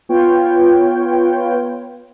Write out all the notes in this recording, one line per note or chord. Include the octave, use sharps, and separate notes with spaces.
B3 F4 B4 C#5 G5